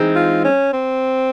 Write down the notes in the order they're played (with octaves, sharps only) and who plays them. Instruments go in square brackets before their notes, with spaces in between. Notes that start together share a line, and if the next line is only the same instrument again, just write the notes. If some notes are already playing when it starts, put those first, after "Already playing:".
Already playing: [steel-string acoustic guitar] E3 G#3 C4 D#4
[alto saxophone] F4
C#4
C4